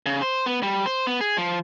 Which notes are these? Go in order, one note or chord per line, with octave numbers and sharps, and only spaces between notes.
C#3
C5
B3
G3
C5
B3
G#4
F3